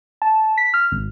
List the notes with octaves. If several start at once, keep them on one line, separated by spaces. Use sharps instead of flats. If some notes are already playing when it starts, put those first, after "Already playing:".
A5
B6
F6
G#1